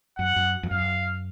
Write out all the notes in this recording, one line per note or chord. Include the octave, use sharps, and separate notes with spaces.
F#2 F#5
F#2
F2
F#2 F5